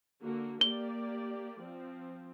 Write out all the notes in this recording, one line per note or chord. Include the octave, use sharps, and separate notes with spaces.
D3 A#3 F#4
A#3 G4 D5 G7
F3 C4